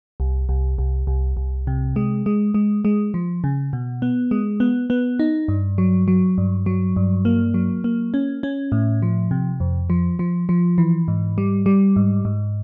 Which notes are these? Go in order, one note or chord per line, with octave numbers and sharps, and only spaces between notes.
C2
C2
C2
C2
C2
C3
G#3
G#3
G#3
G#3
F3
C#3
B2
B3
G#3
B3
B3
D#4
G2
F#3
F#3
G2
F#3
G2
A#3
F#3
A#3
C#4
C#4
A2
F3
C3
F2
F3
F3
F3
E3
G#2
G3
G3
G#2
G#2